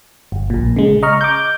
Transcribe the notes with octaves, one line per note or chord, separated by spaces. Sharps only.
G1
A#1 A#2
C#3 G#3
D#5 A#5 C#6 F6
D6 G6